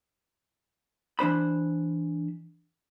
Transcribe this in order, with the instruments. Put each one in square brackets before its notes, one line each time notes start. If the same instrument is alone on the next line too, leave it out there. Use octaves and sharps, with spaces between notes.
[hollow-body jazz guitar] E3 D4 C5 B5